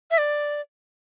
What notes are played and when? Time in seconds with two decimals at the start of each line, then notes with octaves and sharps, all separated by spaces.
0.11 E5
0.18 D5